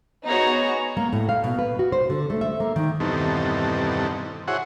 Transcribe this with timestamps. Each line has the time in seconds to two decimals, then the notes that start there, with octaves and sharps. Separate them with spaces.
0.25 B3 D#4 F#4 G#4 C#5 A#5
0.97 A#3
1.13 A2
1.29 F5
1.44 B2
1.59 B4
1.79 F#4
1.92 C5
2.10 D3
2.30 A3
2.41 E5
2.60 A#3
2.76 D#3
3.00 E2 G2 B2 D#3 C4 A4
4.48 E4 F#4 G#4 C5 C#5 F#5